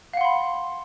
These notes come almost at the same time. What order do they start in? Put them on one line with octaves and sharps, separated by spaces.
F5 F#5 C6 B5